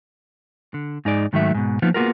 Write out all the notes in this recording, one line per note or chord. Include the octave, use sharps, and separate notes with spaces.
D3
G#2 D#4 G#4 D5
G#2 D#3 F#3 A3 E5
G#2 B2
F3 A#3 B3 D#4 F4
A#3 B3 F4 F#4 G#4 A#4